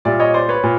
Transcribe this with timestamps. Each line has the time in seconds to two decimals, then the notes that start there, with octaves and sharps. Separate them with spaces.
0.05 A#2 G3 D5 E5
0.19 C#5 D#5
0.34 C5 D5
0.49 B4 C#5
0.63 A#2